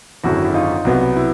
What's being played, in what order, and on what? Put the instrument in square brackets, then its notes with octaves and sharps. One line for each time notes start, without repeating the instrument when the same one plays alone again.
[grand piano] G#1 F#2 D3 E4 F#4
E4
D#4 F4
C2 B2 F#3 B3
E4